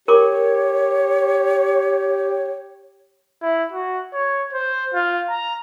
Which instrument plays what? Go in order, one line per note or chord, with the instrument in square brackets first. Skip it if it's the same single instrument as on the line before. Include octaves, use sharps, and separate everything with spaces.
[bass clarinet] G4 [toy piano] A#4 C#6 D6 [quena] C#5
[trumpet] E4
F#4
C#5
C5
F4
A#5